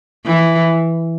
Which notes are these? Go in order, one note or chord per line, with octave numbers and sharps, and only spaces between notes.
E3